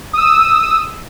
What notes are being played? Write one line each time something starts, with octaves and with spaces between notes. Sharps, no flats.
D#6 E6